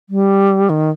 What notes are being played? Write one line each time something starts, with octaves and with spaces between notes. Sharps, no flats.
G3
D#3